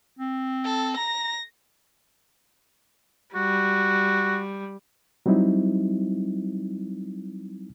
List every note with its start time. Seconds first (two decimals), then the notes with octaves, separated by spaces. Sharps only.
0.19 C4
0.64 A4
0.97 A#5 A#6
3.35 G3 F#4
5.26 F#3 G3 C4 D#4 E4